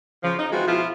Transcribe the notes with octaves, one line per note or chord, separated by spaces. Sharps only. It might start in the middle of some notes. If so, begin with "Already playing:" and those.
C#3 F3
D#4
E3 G#3 C4 F4 F#4
B2 F3 E4 F4